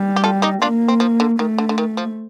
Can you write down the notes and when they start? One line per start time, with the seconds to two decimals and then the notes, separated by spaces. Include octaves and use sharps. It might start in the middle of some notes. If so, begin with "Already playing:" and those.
Already playing: G3
0.16 G4
0.24 F4 A4
0.42 D#4 G4
0.62 A#3 D4 F4
0.88 C4
1.00 F3
1.20 D3
1.39 D#3 A3
1.58 D3
1.69 D3
1.78 D#3
1.97 F3